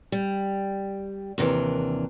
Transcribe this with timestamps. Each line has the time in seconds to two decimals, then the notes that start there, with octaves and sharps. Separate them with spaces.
0.12 G3
1.38 D#2 C3 E3 D4 A#4